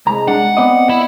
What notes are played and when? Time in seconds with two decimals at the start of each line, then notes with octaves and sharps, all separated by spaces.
0.06 C2 G#3 A#5
0.28 D4 F#5
0.57 B3 C4 D5 D#5
0.89 E4